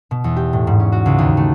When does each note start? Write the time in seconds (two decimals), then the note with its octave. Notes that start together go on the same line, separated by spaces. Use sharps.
0.11 B2
0.24 E2
0.36 G4
0.53 A2
0.67 G#2
0.80 C#4
0.92 F#4
1.06 C#2
1.18 D#2
1.37 A3